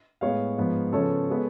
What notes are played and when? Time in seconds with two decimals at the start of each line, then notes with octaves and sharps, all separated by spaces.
0.21 A2 G#3 B3 C#5 F5
0.58 G#2 F3 B3
0.92 C#3 F3 B3 A4 C#5
1.30 G#3 B3